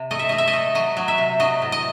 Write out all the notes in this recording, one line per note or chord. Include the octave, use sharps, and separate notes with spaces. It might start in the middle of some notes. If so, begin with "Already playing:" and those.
Already playing: C3
A3 D#5
E5
A3 D#5
E5
D#5
A3
F#3 D#5
F#3
E5
C3
F#3 D#5
A2
D#5